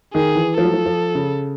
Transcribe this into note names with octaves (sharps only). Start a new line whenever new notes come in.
D#3 G#4
E3
F3 A4
F#3
F3
F3
C#3